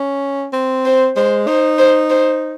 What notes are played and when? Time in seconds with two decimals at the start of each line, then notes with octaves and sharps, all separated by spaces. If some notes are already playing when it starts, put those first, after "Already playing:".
Already playing: C#4
0.53 C4
0.85 C5
1.16 G#3 C5
1.47 D#4 C5
1.79 C5
2.10 C5